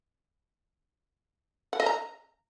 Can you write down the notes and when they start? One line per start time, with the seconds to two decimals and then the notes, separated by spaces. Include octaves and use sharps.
1.73 F#5
1.80 D#5
1.86 A#5